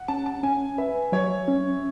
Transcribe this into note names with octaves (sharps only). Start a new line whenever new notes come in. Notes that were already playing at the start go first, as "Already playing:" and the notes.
Already playing: F#5
C#4 A5
A5
C#4 G#5
B4 E5
F#3 C#5
C#4